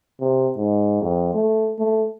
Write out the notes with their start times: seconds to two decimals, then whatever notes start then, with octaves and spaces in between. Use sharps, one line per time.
0.21 C3
0.57 G#2
1.02 F2
1.34 A3
1.79 A3